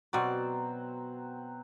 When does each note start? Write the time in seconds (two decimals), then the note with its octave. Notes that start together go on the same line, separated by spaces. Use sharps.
0.13 B2 F#3 C4 D5